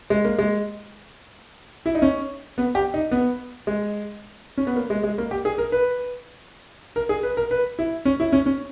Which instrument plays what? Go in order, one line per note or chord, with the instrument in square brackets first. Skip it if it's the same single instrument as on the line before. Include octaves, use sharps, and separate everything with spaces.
[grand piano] G#3
A#3
G#3
E4
D#4
C#4
B3
G4
D#4
B3
G#3
C#4
B3
A#3
G#3
G#3
A#3
G4
G#4
A#4
B4
A#4
G#4
B4
A#4
B4
E4
C#4
E4
C#4
C#4